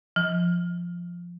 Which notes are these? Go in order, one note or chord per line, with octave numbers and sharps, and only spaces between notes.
F3